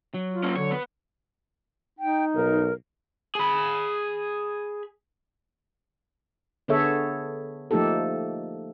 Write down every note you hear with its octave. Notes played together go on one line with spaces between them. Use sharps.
F#3
F4
A#3 C#4
D3 C#5
B3
D#4 G5
B1 A#4
G#4 B5
D3 B3 G#4 A4 C#5 E5
F3 A3 A#3 D#4 G4 A4